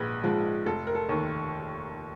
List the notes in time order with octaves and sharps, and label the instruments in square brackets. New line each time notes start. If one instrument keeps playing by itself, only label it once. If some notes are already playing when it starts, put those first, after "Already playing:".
Already playing: [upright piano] A#1 G#2 G#3 B4
G#2 F3 G#3
F1 A4
A#4
A4
D#2 D#3